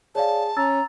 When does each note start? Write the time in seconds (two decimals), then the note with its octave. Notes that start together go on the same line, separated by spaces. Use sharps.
0.15 G#4 C#5 D5 F5 A5
0.57 C#4 A#5 E6 A6